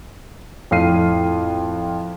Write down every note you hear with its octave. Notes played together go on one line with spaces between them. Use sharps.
F2 A2 F4 F6 C7 D#7